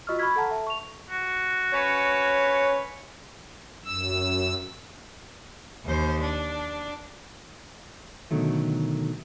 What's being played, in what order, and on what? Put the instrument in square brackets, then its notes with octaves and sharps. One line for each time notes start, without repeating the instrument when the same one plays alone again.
[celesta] F4 F#4 D#5 C#6 E6 F6
B5 C#6 E6 F6 G#6 B6
A4 F#5 A5 A#5
A4 E5 A5
C#6 F7
[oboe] F#4
[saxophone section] C#4 B4 C#5
[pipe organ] F#2 E6
[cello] D#2 C5
D4
[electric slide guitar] B2 D3 D#3 F#3 A3